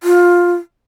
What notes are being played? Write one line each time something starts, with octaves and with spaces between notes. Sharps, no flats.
F4